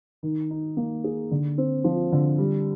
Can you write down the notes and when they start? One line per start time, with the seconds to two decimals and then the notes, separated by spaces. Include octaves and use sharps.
0.23 D#3
0.50 D#4
0.77 A#3
1.04 G#4
1.31 D3
1.58 C4
1.84 F3
2.12 D3
2.38 G3